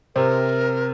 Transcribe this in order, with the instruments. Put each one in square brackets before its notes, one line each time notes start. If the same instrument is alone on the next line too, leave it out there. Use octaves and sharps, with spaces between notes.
[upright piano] C3 C4 [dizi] A#4